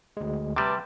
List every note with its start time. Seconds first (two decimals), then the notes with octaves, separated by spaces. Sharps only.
0.17 D2 G#3
0.56 C3 G3 B4 A5 D6